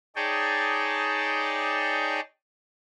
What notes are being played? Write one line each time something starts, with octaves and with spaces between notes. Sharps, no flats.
D#4 G#4 C#5 D5 G5 A5